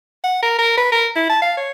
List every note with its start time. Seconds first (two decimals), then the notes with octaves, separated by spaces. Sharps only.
0.24 F#5
0.43 A#4
0.59 A#4
0.78 B4
0.92 A#4
1.16 E4
1.30 A5
1.42 F5
1.57 C#5